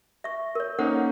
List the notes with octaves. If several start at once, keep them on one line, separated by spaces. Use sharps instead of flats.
E5 C#6
A#4 C#5
A#3 C#4 D#4 A4 C5 F#5